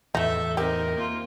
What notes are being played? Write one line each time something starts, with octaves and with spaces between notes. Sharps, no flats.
E2 A2 E3 A3 D#4 A4 E5
C4 D#4 G4 A#4
A#3 F4